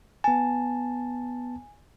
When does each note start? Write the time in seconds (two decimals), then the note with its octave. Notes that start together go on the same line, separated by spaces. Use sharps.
0.24 B3 G#5 A5